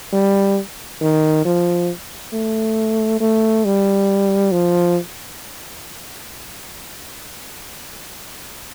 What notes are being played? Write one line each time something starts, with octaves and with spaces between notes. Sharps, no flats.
G3
D#3
F3
A3
A3
G3
F3